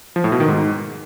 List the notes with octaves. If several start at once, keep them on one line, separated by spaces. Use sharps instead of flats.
F3
A2
B2
D#3
G#2